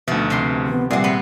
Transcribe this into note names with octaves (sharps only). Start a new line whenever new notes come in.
D2 B2 F3 D#4 E5
C3 C6
D#3 B3
A#2 G3 C4 G#4 D5 E5 F#5
B3